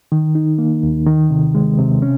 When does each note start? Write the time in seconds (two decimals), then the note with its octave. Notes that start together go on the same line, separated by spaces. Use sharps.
0.12 D#3
0.35 D#4
0.58 A#3
0.83 D#2
1.07 D#3
1.31 C3
1.55 G#3
1.79 C3
2.02 C#4